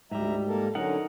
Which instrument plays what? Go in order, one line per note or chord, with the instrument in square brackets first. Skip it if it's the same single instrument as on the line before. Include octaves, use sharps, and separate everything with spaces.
[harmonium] D2 E5 A#5 [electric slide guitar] G#2 G3
[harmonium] A#3 A4 A#4
[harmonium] D3 F#3 C#4 [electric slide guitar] D#4 A#4 F#5